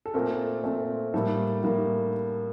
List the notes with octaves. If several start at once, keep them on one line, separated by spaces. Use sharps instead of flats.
A4
A#2 A3 C4 A#4
A#2 A3 C4
A2 G3 A#3 A4
A2 G3 A#3